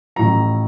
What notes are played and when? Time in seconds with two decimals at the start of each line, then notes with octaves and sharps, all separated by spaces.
0.16 A1 A2 F3 A#5